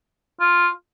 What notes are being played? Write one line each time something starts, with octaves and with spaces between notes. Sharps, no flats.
F4